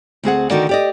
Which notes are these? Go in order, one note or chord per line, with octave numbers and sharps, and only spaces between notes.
D2 C4 G#4 F#5
D3 D#3 D#4 F#4 A#4 D5
G4 D5 D#5